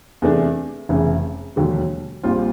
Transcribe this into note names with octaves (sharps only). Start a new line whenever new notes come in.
E2 C3 E3 A3 D4
F1 E2 C#3 E3
E1 D#2 D3 F#3
A#1 A#2 G3 C4 F4